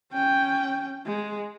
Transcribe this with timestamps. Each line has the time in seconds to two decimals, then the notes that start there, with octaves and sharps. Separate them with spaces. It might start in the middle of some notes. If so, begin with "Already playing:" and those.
0.12 C#4 G5
1.06 G#3